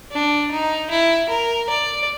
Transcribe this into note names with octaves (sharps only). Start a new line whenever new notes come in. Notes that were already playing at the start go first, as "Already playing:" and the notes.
D4
D#4
E4
A#4
D5